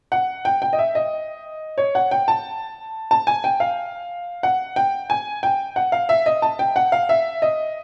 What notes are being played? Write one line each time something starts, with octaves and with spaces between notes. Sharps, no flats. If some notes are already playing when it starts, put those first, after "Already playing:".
F#5
G5
G5
D#5
E5
D#5
C#5
F#5
G5
A5
A5
G#5
G5
F5
F#5
G5
G#5
G5
F#5
F5
E5
D#5
A5
G5
F#5
F5
E5
D#5